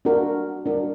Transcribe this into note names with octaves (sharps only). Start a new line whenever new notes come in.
D4 F#4 A#4
D4 F#4 A#4